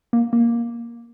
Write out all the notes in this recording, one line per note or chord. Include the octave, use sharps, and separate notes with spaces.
A#3
A#3